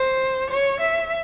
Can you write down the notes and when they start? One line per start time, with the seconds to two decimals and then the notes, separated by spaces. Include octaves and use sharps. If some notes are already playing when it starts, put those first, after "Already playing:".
Already playing: C5
0.50 C#5
0.80 E5